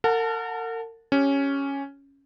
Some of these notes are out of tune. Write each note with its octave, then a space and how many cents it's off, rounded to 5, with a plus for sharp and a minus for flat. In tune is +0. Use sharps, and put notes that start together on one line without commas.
A#4 -40 F#5 -20 A5 +0
C#4 +0 G4 +0